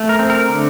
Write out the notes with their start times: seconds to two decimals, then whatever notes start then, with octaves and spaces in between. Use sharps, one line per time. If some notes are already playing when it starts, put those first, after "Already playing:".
Already playing: A3
0.09 A#4
0.19 C4
0.30 A#4
0.49 D3